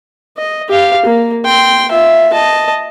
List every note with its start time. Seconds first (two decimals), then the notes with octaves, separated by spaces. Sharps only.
0.37 D#5
0.69 G4 F5
1.05 A#3
1.45 G5 C6
1.91 F4 E5
2.33 D#5 A5